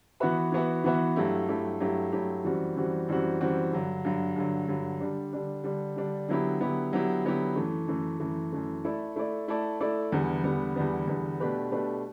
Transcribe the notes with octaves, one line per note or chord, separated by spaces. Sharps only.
E3 B3 F#4 B4 E5
E3 B3 F#4 B4 E5
E3 B3 F#4 B4 E5
G2 F#3 A3 E4 G4
G2 F#3 A3 E4 G4
G2 F#3 A3 E4 G4
G2 F#3 A3 E4 G4
F#2 E3 G3 C4 F#4
F#2 E3 G3 C4 F#4
F#2 E3 G3 C4 F#4
F#2 E3 G3 C4 F#4
G2 D3 F#3
G2 D3 F#3
G2 D3 F#3
G2 D3 F#3
D3 G3 D4
D3 G3 D4
D3 G3 D4
D3 G3 D4
D3 F#3 B3 E4 G4
D3 F#3 B3 E4 G4
D3 F#3 B3 E4 G4
D3 F#3 B3 E4 G4
F#2 E3 A3
F#2 E3 A3
F#2 E3 A3
F#2 E3 A3
A3 E4 A4 D5
A3 E4 A4 D5
A3 E4 A4 D5
A3 E4 A4 D5
E2 D3 G3 B3
E2 D3 G3 B3
E2 D3 G3 B3
E2 D3 G3 B3
B2 A3 D4 G4 B4
B2 A3 D4 G4 B4